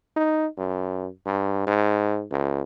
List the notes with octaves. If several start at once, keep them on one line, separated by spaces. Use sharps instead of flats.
D#4
F#2
G2
G#2
C#2